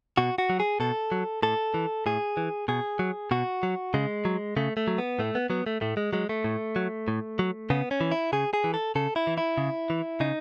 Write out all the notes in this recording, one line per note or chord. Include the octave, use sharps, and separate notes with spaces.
B2 F#4
F#4
F#3
G#4
B2 A4
F#3
A2 A4
E3
A2 G#4
E3
B2 G#4
F#3
B2 F#4
F#3
C#3 G#3
F#3
C#3 A3
A3
F#3
B3
A2 A3
B3
F#3 B3
A3
A2 A3
G#3
F#3 G#3
A3
A2
F#3
A2
F#3
C#3 B3
C#4
E3
E4
C#3 G#4
G#4
E3
A4
C#3 A4
E4
E3
E4
C#3
E3
C#3 D#4